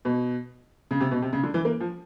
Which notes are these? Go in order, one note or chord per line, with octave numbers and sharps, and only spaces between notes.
B2
C#3
C3
B2
C3
C#3
D3
E3
A#3
F3